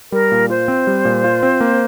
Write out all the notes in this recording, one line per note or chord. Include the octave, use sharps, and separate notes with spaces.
G3 A#4
A#2
F4 C5
C4
G3
A#2
F4
C4
A#3